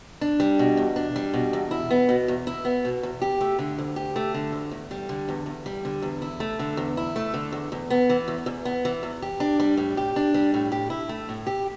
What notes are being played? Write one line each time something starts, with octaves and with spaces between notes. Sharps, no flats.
D4
G3
B2
E2
D4
G3
B2
E2
E4
B3
B2
E2
E4
B3
B2
E2
G4
A3
D3
D2
G4
A3
D3
D2
E2
G3
D3
E2
E2
G3
D3
E2
E4
A3
D3
E2
E4
A3
D3
E2
E2
B3
E3
E2
E2
B3
E3
E2
G4
D4
G3
A2
G4
D4
G3
A2
G4
E4
A3
A2
G4